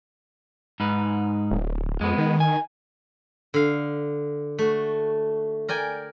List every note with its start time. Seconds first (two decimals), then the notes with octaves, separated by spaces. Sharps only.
0.80 G#2 D#4 B4
1.51 D1
2.01 F2 G#3 B3
2.18 D#3
2.40 G#5
3.54 D3 F5
4.59 A3 F#4
5.68 A#4 D5 G5 G#5